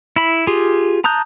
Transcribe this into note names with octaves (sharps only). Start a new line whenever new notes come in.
E4 B5
F4 G4 G#4
A5 A#5 D#6 F#6 G6